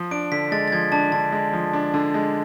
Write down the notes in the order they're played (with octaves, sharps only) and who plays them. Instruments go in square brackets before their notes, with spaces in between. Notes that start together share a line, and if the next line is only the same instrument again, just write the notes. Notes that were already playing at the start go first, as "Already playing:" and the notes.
Already playing: [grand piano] F3
[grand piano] D4 [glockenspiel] D7
[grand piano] D3 [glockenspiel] B6
[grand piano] G#3 [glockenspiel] A6
[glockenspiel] A6
[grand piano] F3 [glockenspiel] G#6
[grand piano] D4 [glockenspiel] A5
[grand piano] D3 [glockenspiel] A5
[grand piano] G#3
F3
D4
D3
G#3